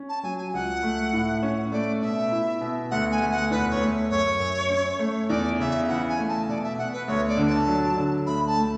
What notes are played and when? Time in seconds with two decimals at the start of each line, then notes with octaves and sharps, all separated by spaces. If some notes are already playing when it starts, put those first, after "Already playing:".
Already playing: C#4
0.09 A5
0.23 F#3 G#5
0.38 G#5
0.53 C#2 F#5
0.83 A3
1.13 A2
1.43 C#4
1.72 A3 D5
2.01 B2 E5
2.31 E4
2.61 B2
2.91 D2 F#5
3.11 G#5
3.21 D2
3.32 F#5
3.51 E2 B4
3.70 C#5
3.81 A3
4.10 F#2 C#5
4.40 F#2
4.70 C#4
4.99 A3
5.29 E2 D5
5.60 C#3 E5
5.88 E3 F#5
6.08 G#5
6.19 A3
6.29 A5
6.48 B2 D5
6.63 E5
6.78 B2 F#5
6.93 B4
7.08 D2 C#5
7.28 D5
7.37 D3
7.47 A5
7.67 F#3
7.97 D3
8.26 D2 B5
8.47 A5
8.57 A3